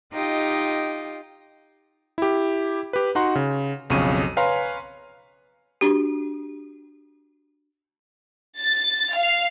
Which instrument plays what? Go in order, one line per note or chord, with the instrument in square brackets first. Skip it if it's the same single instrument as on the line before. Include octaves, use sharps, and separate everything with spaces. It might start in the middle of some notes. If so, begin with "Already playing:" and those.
[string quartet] D#4 F4 G4 D#5 G5
[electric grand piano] E4 G4
G4 B4
D#4 F#4 F#5 A#5 C6
C#3
B1 F2 C#3 C#6 D#7
B4 C#5 F5 G#5 A#5 C6
[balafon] D4 F#4 G4
[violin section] A6
F5